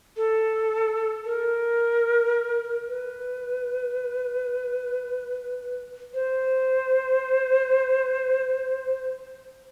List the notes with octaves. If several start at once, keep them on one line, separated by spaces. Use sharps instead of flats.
A4
A#4
B4
C5